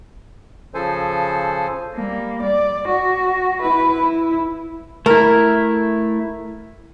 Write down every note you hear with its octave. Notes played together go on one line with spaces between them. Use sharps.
C#3 F3 A4 C5 G#5
G3 A#3
D5
F#4
E4 B4
E4
A3 E4 A#4